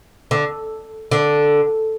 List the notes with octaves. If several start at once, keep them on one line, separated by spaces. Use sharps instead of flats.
D3
D3